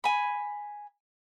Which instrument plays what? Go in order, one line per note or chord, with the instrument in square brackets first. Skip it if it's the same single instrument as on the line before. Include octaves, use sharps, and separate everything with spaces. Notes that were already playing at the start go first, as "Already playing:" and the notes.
[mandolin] G#5 B5